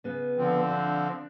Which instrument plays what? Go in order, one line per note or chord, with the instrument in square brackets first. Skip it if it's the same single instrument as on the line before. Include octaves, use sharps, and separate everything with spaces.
[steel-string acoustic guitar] C#3 B3
[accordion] D3 F3 C4
[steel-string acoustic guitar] D4